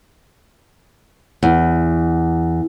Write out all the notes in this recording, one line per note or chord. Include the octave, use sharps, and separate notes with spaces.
E2